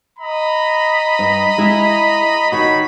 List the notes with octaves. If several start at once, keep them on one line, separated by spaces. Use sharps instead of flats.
D#5 A#5 B5
G2
G#3 E4
D#3 D#4 F#4 C#5 B5